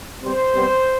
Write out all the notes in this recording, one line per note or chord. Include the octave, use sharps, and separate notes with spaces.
C3 G3 B3 C5
C3 G3 B3